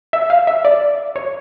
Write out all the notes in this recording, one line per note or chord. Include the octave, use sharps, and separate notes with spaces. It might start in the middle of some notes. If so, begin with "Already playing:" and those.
E5
F5
E5
D5
C#5